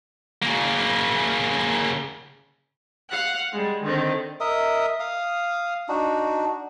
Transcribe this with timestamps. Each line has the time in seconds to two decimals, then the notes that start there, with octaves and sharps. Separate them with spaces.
0.43 C#3 A#3
3.08 F5 F#5 F#6
3.51 G3 G#3
3.82 D3 D#3 C4
4.40 A#4 D#5 E5 D#6
5.00 F5 D#6
5.89 D4 D#4 F#4